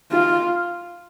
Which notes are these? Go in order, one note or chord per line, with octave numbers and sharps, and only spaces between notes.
F4